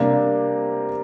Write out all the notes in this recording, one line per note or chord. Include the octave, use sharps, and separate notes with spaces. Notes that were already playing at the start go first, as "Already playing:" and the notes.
Already playing: C3 G3 A#3 D4